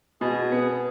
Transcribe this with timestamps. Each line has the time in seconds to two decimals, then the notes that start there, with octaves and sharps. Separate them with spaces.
0.21 B2 G#4
0.52 B3